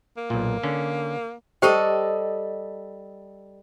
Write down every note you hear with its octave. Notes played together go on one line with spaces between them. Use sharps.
A#3
B1 A#2
D3 C#4
G3 G4 A4 C5 D#5 G5